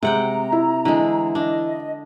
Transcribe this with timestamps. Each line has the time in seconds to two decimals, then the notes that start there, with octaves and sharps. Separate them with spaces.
0.03 C3 G#3 F#5 G5 A#5
0.52 E4
0.85 D3 E3 G#3
1.35 D4 D#5